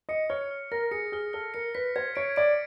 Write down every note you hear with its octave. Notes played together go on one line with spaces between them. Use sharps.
D#5 C#7
C#5 F6
F6
A#4 A#6
G#4 C#7
G#4 F6
A4 F6
A#4 C#7
B4 B6
C5 G#6
C#5 D7
D5 D7